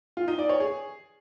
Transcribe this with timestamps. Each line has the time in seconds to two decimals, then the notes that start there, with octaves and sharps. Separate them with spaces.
0.17 F4
0.28 D#4
0.39 D5
0.49 C#5
0.60 G#4